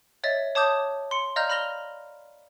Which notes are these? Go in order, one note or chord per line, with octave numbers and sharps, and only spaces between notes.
C#5 D#5 E5 A6
C#5 A5 D6 D#6 G6
C6 C#7
D5 D#5 F5 A#5 F6 G6
B5 F6 A#6 F7 G7